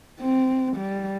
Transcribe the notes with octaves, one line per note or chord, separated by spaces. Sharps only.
C4
G3